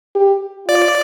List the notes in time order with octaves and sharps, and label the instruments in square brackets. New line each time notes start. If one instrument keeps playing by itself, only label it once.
[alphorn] G4
[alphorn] F4 [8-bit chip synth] D5